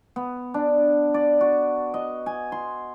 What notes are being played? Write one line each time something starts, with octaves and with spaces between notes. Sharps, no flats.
B3
D4
D5
F#4
D#5
G#5
C6